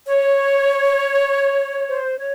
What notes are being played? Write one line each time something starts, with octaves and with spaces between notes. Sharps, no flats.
C#5
C5
C#5